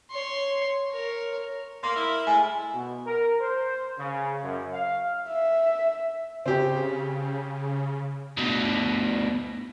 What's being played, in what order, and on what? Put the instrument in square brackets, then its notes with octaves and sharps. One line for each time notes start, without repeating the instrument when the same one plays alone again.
[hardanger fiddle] C#5 C6
A#4 C#5
[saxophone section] A#3 [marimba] C6
[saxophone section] E4 A#4 E5
[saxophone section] A2 G#3 E4 [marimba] G#5
[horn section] B2
A#4
C5
C#3
F#2
F5
[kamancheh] E5
[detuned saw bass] C#3 [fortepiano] C4 G4
[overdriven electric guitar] D2 B2